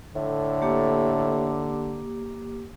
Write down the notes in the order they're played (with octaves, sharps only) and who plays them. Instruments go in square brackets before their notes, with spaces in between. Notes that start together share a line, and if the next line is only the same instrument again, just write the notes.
[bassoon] A2 [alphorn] D3
[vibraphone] A#3 G4 D6